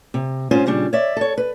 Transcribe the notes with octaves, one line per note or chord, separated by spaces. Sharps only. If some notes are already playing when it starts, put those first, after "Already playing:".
C3
G#2 C#4 F4 C5
A#2 C#3 G3 D4
C#5 D5 E5
A4 C#5
B4